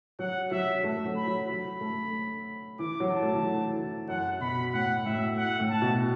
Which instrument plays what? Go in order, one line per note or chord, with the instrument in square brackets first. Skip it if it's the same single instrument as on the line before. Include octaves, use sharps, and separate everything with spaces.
[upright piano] F#3 [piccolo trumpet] F#5
[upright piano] F#3 [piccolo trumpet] E5
[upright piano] A3
F#3
[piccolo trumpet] B5
[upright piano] F#3
[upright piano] F#3 [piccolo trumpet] B5
[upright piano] A3
[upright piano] E3 [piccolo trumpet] D6
[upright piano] F#3
[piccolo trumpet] A5
[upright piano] A3
E3
F#3
E3
[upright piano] F#2 [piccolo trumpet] F#5
[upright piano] B2 [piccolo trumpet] B5
[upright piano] A2 [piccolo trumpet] F#5
[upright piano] A2 [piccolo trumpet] E5
[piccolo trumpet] F#5
[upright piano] A2
[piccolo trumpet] A5
[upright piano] B2